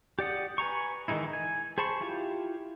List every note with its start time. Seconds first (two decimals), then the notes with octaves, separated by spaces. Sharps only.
0.19 G4 D5 F#5 D#6
0.58 B4 G#5 A#5 C#6
1.08 D#3 E3 G#3 D#4 E4
1.33 G#5
1.78 G#4 C5 A5 B5 C#6
2.01 E4 F4 G4